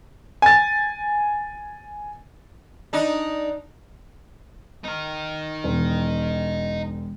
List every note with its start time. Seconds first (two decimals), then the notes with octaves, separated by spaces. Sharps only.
0.42 G#5 A6
2.93 D4 D#4
4.84 D#4 A#4
5.64 E1